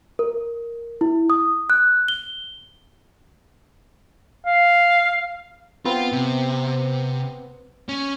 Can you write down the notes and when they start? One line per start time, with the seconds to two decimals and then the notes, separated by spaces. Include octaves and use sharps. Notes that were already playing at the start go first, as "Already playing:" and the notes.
0.19 A#4
1.01 E4
1.30 D#6
1.70 F#6
2.08 G7
4.46 F5
5.86 B3 C4 F4
6.12 C3
7.89 C#4